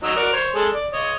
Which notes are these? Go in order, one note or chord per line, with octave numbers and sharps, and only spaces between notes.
F#3 D#4 E6
F#4 A#4 D5
C5 C#5
G#3 G#4 A4
D5
C#5 D#5